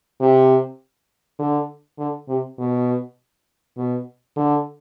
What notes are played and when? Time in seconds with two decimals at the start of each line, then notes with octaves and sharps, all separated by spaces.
0.21 C3
1.39 D3
1.98 D3
2.28 C3
2.59 B2
3.77 B2
4.37 D3